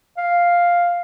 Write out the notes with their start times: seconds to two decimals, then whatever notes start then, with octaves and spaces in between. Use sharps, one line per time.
0.17 F5